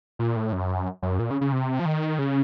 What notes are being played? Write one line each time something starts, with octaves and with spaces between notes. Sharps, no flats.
A#2
A2
F#2
F#2
A#2
C#3
C#3
C3
F3
D#3
C#3